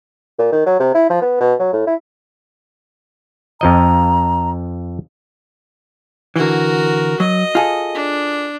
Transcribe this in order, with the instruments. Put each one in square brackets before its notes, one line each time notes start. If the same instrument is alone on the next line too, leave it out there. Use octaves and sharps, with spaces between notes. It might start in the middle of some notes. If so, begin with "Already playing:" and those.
[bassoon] A#2
D#3
F#3
C3
E4
F3
B3
B2
F#3
A2
E4
[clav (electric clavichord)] F2 F3 D#5 [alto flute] A#5
[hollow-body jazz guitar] D3 E3 [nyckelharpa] F#4 A#4
[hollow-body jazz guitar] F#3 [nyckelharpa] D#5
[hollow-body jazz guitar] F4 G#4 A4
[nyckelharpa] D4